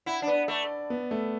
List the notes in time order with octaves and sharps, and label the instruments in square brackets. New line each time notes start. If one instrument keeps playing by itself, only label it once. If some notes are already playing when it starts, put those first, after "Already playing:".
[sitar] E4 [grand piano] F#5
[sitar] D4
B3
[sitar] A3 [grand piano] D5
[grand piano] B3
A3